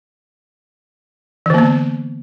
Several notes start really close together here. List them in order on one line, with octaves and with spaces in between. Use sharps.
E3 D3 A#3 B3